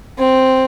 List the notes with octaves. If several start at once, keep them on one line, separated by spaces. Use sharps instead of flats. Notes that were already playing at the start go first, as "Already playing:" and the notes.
C4